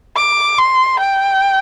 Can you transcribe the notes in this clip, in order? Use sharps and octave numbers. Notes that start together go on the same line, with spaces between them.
D6
C6
G5